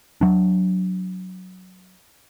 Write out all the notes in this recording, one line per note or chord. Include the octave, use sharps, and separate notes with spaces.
F#3 D4